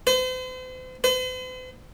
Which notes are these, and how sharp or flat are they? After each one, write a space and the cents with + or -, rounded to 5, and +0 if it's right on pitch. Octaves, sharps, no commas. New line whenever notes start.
C5 -40
C5 -45